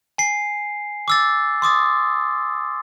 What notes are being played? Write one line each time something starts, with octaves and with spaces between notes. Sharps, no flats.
G#5 C7
D6 E6 A6
C6 D6 D#6 A6